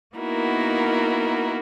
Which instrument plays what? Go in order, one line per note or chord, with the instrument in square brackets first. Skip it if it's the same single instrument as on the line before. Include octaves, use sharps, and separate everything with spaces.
[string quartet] A#3 B3 D#4 E4 F#4 A#4